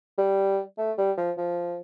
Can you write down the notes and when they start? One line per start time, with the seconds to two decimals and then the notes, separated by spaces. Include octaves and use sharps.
0.18 G3
0.78 A3
0.98 G3
1.17 F3
1.38 F3